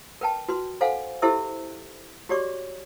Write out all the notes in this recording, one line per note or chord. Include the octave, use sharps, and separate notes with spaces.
A#4 B4 G5 A5
F#4 B4 C6
A4 C5 F5 F#5 G#5
E4 G4 A4 C5 E5 E6
F#4 G4 C#5 D5 C#6 D6